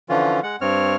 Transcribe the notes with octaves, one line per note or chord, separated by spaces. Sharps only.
D3 E3 F3 C#4 F4
G#3 F#5
G2 C4 C#5 F6